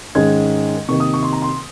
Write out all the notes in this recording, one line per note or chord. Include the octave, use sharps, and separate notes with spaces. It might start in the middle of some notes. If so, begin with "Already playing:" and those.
G#2 D#3 G#3 C#4 G#6
C3 D#3 A#3 C#6
D#6
C#6
C6
A#5
C6